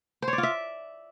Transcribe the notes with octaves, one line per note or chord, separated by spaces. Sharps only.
C5
C#5
D5
F4
E5